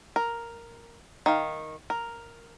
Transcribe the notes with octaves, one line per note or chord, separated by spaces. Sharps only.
A#4
D#3 F5
A#4